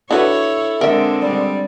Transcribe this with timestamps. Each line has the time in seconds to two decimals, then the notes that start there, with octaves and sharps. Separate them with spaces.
0.11 D4 E4 F#4 A4 B4 C#5
0.81 D3 G#3 C4 A#4 E5
1.22 G3 D5